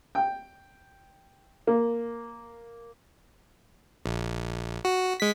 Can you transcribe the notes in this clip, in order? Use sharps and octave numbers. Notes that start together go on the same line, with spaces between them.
G5
A#3
A#1
F#4
G#3 B6